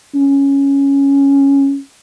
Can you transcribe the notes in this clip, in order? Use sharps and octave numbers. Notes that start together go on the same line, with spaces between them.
C#4